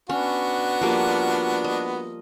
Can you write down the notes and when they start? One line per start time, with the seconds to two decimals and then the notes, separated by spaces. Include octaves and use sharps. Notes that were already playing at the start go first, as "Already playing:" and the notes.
0.09 B3 C#4 D4 F#4
0.81 F3 G3 A#3
1.64 D#5